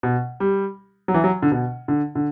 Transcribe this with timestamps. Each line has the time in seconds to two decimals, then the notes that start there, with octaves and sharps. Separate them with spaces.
0.03 B2
0.40 G3
1.08 F#3
1.14 E3
1.24 F#3
1.42 D3
1.51 B2
1.88 D3
2.15 D3